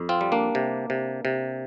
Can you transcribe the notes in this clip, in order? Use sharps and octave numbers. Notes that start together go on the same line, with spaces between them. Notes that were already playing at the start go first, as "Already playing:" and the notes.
Already playing: F2
C4 F4
G3
A#3 D4
C3
C3
C3